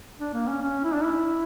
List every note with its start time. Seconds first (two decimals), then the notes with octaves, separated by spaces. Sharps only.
0.20 D4
0.33 A#3
0.48 C#4
0.62 C#4
0.84 E4
0.94 D4
1.04 E4